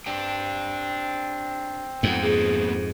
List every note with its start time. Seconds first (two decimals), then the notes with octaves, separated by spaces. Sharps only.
0.06 C4 D4 G4 G5
2.03 F2 G#2 A3 B3
2.22 A#3 B3 F4 G#4